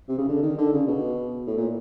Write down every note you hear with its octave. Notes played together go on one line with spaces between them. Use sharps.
C3
C#3
D3
D#3
D3
C#3
B2
A2
A#2